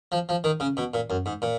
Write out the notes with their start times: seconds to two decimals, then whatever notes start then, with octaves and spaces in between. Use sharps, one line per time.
0.12 F3
0.29 F3
0.44 D#3
0.60 C#3
0.77 B2
0.94 A#2
1.10 F#2
1.26 G#2
1.42 A#2